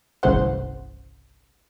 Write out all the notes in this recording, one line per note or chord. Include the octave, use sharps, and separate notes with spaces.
G1 C2 C#3 E3 C5 F#5